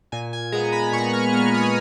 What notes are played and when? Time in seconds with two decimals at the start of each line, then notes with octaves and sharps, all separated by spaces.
0.12 A#2 G#5
0.33 G#5
0.52 G#3 B3 A#5
0.72 B5
0.93 A#2 C#6
1.13 F6
1.33 G#3 B3 F6
1.54 D#6